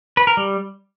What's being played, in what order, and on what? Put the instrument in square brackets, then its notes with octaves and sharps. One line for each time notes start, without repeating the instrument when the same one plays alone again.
[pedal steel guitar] B4
A#4
G3